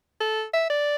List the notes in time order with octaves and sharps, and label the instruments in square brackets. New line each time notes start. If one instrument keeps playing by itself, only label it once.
[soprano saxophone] A4
E5
D5